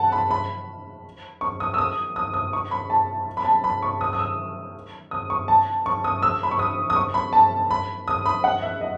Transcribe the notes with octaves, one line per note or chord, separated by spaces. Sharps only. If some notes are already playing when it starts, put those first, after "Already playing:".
Already playing: F#5 A5
B5
B5
C#6
D#6
E6
D#6
D#6
D#6
C#6
B5
A5
B5
A5
B5
C#6
D#6
D#6
E6
D#6
C#6
A5
C#6
D#6
E6
B5
C#6
D#6
D#6
C#6
B5
A5
B5
D#6
B5
F#5
E5
D#5